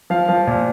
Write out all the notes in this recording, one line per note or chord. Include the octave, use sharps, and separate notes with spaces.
F3 F5
F3
A#2